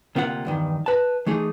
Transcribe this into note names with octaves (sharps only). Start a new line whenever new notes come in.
D2 C3 A#3 F4 G4 F#5
E2 G2 D#3
B4 A5
E3 A3 D#4 G#4